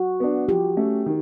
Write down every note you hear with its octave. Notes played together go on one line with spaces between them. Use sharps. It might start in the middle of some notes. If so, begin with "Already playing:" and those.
Already playing: F#4
B3 D4
F3 G4
A3 C#4
D#3